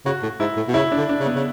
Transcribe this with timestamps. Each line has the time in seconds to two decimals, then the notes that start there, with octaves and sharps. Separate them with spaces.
0.05 C#3 F#4
0.23 A2
0.40 G#2 E4
0.57 A2
0.68 B2
0.74 C#3 E4
0.92 D4
0.97 D3
1.09 D4
1.20 C#3
1.25 B3
1.35 C#3